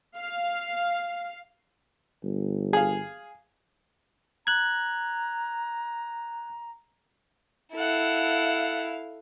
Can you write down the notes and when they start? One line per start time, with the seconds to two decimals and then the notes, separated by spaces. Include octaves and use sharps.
0.16 F5
2.24 G1
2.73 G#4 F5
4.47 A#5 F#6 G#6
7.74 E4 A4 F5 F#5